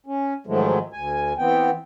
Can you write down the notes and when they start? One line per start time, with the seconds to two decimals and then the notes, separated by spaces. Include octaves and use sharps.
0.06 C#4
0.47 G#2 D#3 F3 F#3 G#3 A3
0.93 D2 G#5
1.38 E3 B3 C4 G5